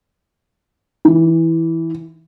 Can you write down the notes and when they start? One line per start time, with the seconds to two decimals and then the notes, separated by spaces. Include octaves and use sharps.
1.05 E3